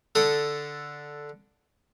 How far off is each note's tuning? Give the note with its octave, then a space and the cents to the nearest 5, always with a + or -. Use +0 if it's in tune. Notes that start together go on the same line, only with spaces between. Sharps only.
D3 +0 A4 +0 D#6 +0